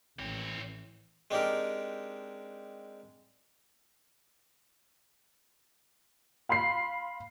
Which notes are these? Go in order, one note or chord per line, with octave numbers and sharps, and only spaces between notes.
A1 E3 C4 C#5
G#3 C4 D4 D#4 G4 A#4
F5 B5 C6 C7